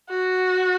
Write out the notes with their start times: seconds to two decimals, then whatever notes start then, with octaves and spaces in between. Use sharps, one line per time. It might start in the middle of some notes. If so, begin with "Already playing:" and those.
0.09 F#4